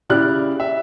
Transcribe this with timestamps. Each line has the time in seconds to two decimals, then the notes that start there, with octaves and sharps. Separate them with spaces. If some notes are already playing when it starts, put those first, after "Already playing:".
0.09 C#3 E4 G4 D5 F6 F#6
0.60 E5